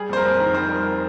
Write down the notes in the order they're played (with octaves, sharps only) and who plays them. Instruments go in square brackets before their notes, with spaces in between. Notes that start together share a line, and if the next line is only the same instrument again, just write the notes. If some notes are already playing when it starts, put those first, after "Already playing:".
Already playing: [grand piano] G3 G#4
F2 C5
A#4
F2
D#3 A#4
G3 C5
F2 A#4